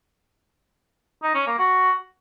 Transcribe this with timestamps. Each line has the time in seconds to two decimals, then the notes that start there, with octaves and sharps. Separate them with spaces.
1.23 D#4
1.35 C#4
1.46 A#3
1.58 F#4